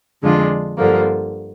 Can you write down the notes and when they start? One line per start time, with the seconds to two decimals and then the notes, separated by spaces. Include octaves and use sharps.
0.23 F2 D3 G#3 D4 F4
0.77 G2 D3 F3 A#3